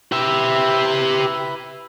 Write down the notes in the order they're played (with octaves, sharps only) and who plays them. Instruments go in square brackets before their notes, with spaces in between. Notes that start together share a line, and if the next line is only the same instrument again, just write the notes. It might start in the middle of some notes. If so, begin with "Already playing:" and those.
[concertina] E4 B4 [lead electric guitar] G4 E5